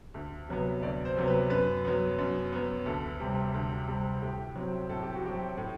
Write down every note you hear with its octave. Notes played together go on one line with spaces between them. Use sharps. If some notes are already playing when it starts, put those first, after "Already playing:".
D2
C3 F#3 B3
D2 D5
C5
C3 F#3 B3
B4
F#2 B4
F#3 B3
F#2
F#3 B3
D2 A4
C3 G3 C4
D2
C3 G3 C4
A2 G4
F#3 C4
A2 A4
G4
F#4
F#3 C4 G4
A2